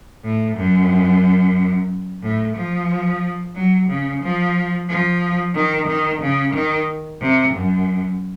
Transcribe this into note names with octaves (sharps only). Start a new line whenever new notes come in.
A2
F#2
A2
F3
F#3
C#3
F3
F3
D#3
D#3
C#3
D#3
C3
F#2